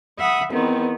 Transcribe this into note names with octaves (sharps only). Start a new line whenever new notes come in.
E5 F#5 B5 D#6
E2 D#3 B3 C4